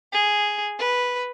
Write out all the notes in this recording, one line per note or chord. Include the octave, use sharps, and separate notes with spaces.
G#4
B4